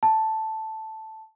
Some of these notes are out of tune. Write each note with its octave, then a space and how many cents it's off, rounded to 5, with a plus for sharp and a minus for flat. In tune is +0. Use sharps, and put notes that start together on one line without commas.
A5 +0